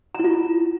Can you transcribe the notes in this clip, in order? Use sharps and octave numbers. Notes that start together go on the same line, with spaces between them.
E4 F4 A#5